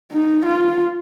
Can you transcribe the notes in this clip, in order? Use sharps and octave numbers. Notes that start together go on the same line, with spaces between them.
D#4
F4